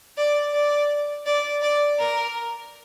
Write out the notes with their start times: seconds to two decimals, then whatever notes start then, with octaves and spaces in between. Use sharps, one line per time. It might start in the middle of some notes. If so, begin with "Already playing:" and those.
0.18 D5
0.54 D5
1.26 D5
1.62 D5
1.99 A#4